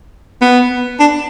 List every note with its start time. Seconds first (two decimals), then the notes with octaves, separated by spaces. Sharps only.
0.41 B3
1.00 D4